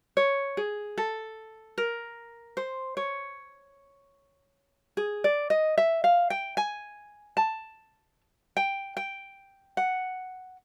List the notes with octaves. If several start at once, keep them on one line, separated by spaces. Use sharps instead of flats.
C#5
G#4
A4
A#4
C5
C#5
G#4
D5
D#5
E5
F5
G5
G#5
A5
G5
G5
F#5